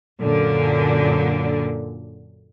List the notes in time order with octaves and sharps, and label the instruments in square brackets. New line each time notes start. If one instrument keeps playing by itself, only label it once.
[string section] F#2 A#2 D3